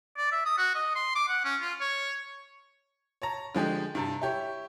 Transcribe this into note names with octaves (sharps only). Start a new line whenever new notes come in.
D5
E5
D#6
F#4
D#5
C6
D6
F#5
C#4
F4
C#5
C#5 A5 A#5
D3 F3 G#3 G4
G2 C3 A5
E4 G4 C#5